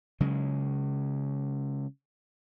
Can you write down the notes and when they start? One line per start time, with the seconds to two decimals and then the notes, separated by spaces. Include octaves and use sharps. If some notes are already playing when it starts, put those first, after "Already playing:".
0.20 C#3 F#3 G#3